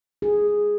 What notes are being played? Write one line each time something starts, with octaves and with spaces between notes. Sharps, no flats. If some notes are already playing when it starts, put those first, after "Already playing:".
G#4